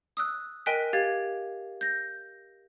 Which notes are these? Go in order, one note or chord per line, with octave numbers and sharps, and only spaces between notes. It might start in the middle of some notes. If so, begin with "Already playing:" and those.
D#6 E6 F#6
A#4 D#5 G5 G#5 F#6 B6
G4 F5 G#6 A6
G6 A#6